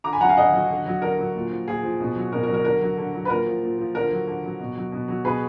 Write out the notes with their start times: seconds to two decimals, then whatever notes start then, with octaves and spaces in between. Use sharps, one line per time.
0.04 D3 A#5 D6
0.13 G#5 B5
0.20 F#3 F#5 A#5
0.29 F5 G#5
0.37 D3 D#5 F#5
0.53 F#3
0.70 D3
0.86 F#3
1.02 D3 A#4
1.18 F#3
1.35 A#2
1.50 F3
1.67 A#2 G#4
1.83 F3
2.00 B2
2.16 F#3
2.32 B2 A#4
2.43 A#4
2.48 F#3
2.54 A#4
2.64 D3 A#4
2.81 F#3
2.97 D3
3.13 F#3
3.25 B4
3.30 A#2 A#4
3.46 F3
3.62 A#2
3.78 F3
3.95 D3 A#4
4.11 F#3
4.27 D3
4.44 F#3
4.60 B2
4.76 F#3
4.92 B2
5.08 F#3
5.25 B2 G#4 B4